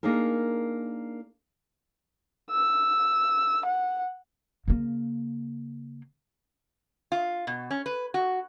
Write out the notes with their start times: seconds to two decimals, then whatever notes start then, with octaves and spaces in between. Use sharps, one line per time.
0.03 A#3 D4 D#4 G#4 A#4
2.51 E6
3.65 F#5
4.68 C#3 A#3
7.12 F4
7.47 B2
7.71 C#4
7.86 B4
8.14 F#4